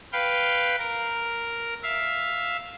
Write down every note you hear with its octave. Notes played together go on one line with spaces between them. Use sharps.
B4 F5 G5
A#4
E5 F5